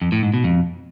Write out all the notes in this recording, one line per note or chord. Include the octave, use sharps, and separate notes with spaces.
F2
A2
G#2
B2
F2